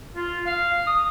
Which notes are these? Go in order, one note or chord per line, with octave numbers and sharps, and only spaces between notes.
F4
F5
D#6